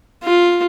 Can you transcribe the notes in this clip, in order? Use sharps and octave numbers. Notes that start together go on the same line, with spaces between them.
F4